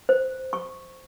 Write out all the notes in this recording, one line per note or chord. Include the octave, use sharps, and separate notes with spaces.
C5
C#6